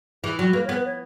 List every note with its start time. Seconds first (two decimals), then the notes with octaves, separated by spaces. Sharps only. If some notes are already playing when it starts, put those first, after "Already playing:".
0.23 E3 G#4
0.39 F#3
0.53 A#3 B4
0.65 C#5
0.69 B3
0.74 B4
0.85 C#5